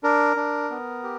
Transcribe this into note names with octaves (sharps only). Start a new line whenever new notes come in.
D4 A#4
D4
B3
G4